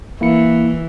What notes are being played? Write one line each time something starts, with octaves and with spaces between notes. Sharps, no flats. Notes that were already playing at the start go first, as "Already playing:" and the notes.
E3 A#3 E4 C#7